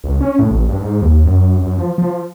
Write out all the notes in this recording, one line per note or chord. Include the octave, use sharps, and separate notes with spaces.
C#2
C#4
A2
A1
G2
G#2
D#2
F#2
F#2
F3
F3